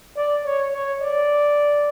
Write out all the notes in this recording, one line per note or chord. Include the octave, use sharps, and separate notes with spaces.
D5
C#5
C#5
D5